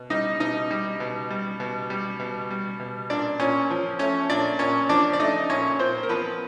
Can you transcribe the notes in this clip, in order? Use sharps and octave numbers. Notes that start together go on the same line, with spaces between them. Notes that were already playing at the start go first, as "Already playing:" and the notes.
Already playing: B2
G3 D#4 D#5
B2 D#4 D#5
G3
B2
G3
B2
G3
B2
G3
B2
A#2 D4 D5
A#2 C#4 C#5
F3
A3 C#4 C#5
A#2 D4 D5
A#2 C#4 C#5
F3 D4 D5
D5
A3 D#4 D#5
A#2 C#4 C#5
A#2 C4 C5
A#4
F3 B3 B4